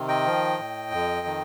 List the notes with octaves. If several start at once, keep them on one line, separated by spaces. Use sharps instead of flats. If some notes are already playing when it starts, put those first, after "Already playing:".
Already playing: C3 D#3
D#5 G5
F3
A2
F2
D#3